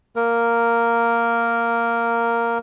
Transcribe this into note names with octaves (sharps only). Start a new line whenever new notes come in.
A#3 A#4